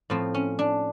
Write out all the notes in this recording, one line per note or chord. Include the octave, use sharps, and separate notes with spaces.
A2 F3 C4
C#4
D4